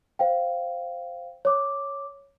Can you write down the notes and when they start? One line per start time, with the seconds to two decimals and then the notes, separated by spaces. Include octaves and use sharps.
0.19 C5 F5 G5
1.45 C#5 D6